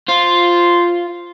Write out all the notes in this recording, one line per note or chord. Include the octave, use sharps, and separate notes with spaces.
F4 C5